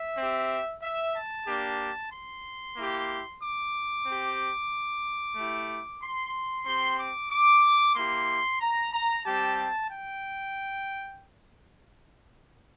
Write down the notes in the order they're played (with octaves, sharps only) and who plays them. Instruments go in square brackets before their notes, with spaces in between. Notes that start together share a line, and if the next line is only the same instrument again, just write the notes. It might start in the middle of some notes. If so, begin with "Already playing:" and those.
Already playing: [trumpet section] E5
C4 G4
E5
A5
A#3 D4 G4
C6
A#3 E4 G4
D6
C4 G4
A3 E4 G4
C6
C4 G4 C6
D6
D6
A#3 E4 G4 C6
A#5
A#5
G3 C4 G4 A5
G5